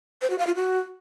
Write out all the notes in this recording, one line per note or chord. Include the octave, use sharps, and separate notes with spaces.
C5
F#4
F5
F4
F#4